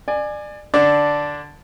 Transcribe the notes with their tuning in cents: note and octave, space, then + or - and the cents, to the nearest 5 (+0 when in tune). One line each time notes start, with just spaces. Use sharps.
D5 +30 G#5 +0
D3 +0 D4 +0 D5 +0